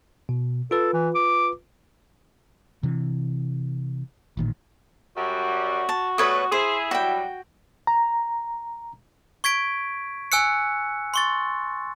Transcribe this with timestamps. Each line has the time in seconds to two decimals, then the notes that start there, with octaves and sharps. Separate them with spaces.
0.29 B2
0.71 F4 A4 B4
0.93 E3
1.15 D6
2.83 C3 E3
4.37 A1 A#2 D#3
5.17 F#2 G3 F#4
5.89 A5
6.18 B2 G3 A3 B4 C#5 D#6
6.52 E4 G#4 C5
6.91 F#3 G3 F#4 G5
7.87 A#5
9.44 C#6 G#6 B6 D7
10.32 G#5 E6 F#6 C#7
11.14 C6 C#6 A6